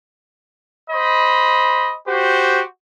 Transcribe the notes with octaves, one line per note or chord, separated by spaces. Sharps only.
C5 D#5 B5
F#4 G4 C5